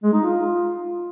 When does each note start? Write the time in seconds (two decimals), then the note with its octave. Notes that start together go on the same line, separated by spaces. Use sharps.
0.03 G#3
0.13 D#4
0.23 F4